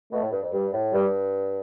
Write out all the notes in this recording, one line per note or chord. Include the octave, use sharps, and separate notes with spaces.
B2 A3
A2
G2
F2
G2 G3
A2
G2 G3